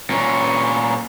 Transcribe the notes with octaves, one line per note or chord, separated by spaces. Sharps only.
A#2 C#4